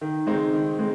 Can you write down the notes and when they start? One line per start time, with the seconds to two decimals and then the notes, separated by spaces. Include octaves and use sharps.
0.01 D#3
0.27 G#3 C4 D#4
0.53 D#3
0.79 G#3 C4